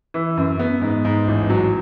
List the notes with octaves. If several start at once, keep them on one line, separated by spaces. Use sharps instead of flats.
E3
F#2
B3
G#2
G#2
A1
F#3